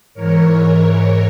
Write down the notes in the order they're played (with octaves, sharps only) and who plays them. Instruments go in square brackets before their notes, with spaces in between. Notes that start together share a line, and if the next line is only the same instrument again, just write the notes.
[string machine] G#2 E3 A#4 C#5